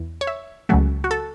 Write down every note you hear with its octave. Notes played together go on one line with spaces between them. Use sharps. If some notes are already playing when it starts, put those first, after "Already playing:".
Already playing: E2 E3
C#5
E5
C#2 C#3 F#3 A3 F#4
F#4
A4